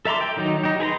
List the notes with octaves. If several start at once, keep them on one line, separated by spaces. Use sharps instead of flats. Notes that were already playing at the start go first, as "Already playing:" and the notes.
A4 E5 A#5 C6 D6
G5
D#3 F#3 D#4
D#4 G4
G#4 B4 A#5 C6